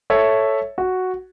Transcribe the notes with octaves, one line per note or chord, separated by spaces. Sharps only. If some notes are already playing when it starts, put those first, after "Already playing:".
A4 C#5 E5
F#4